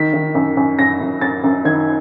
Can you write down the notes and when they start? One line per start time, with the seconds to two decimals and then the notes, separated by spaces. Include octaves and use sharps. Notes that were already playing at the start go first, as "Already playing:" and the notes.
Already playing: D#3 B6
0.14 D#3
0.35 F#2
0.57 F#2
0.79 F#2 A#6
1.01 F#2
1.21 F#2 A6
1.44 F#2
1.65 D#3 G#6